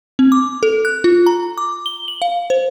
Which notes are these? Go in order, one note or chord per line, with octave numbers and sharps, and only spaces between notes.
C4
D6
A4
F#6
F4
A#5
D6
G7
F#7
F5
C5